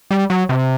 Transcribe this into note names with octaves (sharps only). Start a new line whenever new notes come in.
G3
F#3
C3